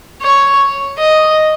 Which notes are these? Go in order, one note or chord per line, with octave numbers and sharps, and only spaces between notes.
C#5
D#5